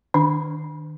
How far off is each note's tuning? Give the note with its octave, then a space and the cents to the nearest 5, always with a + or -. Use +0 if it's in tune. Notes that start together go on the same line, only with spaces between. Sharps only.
D#3 -20 D4 +5